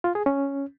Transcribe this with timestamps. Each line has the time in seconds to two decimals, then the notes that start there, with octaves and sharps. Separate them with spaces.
0.04 F4
0.15 G#4
0.26 C#4